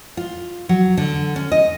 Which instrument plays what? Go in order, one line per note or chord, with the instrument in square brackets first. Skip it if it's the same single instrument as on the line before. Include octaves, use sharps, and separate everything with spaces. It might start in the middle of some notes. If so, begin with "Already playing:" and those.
[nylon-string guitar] F4
F#3
D3
C#4
D#5